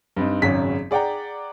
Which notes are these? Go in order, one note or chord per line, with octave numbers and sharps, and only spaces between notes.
G2 C4 D#4
G#1 F#2 C#3 F#3 G#4 B6
G#4 D5 F#5 G5 A#5